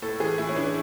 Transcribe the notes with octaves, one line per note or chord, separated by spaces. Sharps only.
A2 A4
E3 G#4
A2 E4
C#4
E3 D4